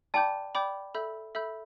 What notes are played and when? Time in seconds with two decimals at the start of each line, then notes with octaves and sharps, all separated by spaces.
0.14 D5 G5 A5 B5 D6 G6
0.55 D5 G5 B5 D6 G6
0.95 A4 E5 B5 E6 G6
1.35 A4 E5 B5 E6 G6